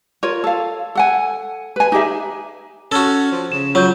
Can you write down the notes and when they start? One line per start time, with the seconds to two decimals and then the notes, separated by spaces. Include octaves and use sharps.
0.23 F4 A#4 C#5
0.44 A4 F5
0.95 A4 F#5 G#5
1.76 B4 G#5
1.92 D#4 G4 G#4 E5
2.92 C#4 F#4 A4
3.32 F3
3.52 C#3 E7
3.75 F#3 F4 G6